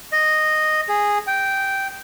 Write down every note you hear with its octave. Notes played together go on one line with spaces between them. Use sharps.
D#5
G#4
G5